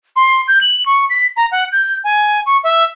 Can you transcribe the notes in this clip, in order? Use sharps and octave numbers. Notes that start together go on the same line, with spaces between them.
C6
G6
F#7
C#6
B6
A#5
F#5
G6
G#5
C#6
E5